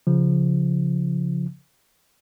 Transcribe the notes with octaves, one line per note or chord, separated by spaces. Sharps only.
C#3 F3